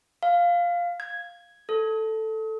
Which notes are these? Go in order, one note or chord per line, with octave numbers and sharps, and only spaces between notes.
F5
G#6
A4